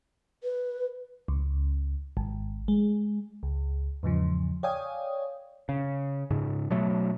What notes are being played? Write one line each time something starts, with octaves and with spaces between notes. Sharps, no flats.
B4
C#2
G#1
G#3
C#2
E2 G#2 C#3 F3
C#5 D5 F5 G5 G#5 D#6
C#3
G#2 C#3
B2 F#3 A3